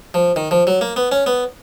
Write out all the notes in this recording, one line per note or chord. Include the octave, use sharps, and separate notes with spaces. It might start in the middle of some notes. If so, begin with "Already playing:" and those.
F3
D#3
F3
F#3
A#3
B3
C#4
B3